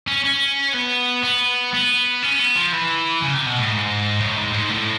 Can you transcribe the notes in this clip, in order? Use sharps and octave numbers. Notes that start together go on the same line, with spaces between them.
C#4
C#4
B3
B3
B3
C#4
B3
F3
E3
C#3
C3
B2
A2
G#2
A2
G#2
G#2
A2